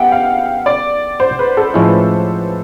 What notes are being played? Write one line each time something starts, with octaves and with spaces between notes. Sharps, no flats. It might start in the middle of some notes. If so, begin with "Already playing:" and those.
Already playing: B3 G4 E5 F#5 G5
F5
D5
C5
B4
A4
A2 F3 G#3 C#4 E4